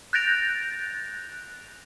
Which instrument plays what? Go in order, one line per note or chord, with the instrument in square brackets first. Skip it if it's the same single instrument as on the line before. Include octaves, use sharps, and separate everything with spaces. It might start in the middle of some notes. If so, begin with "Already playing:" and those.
[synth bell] F#6 G6 A6 A#6 D7 F7